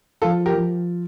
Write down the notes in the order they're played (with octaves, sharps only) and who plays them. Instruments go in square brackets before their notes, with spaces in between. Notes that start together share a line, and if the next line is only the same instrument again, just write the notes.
[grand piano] F3 [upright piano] F4 A4
[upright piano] G4 A#4
[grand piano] F3